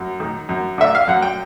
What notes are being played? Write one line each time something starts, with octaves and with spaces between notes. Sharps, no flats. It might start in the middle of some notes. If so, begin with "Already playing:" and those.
Already playing: F#2
D#3
F#2
D3 E5
F5
F#2 F#5
G5